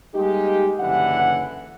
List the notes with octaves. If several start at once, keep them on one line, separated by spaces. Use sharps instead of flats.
G3 G#3 A#3 D#4 G4
F#1 D3 E3 F#5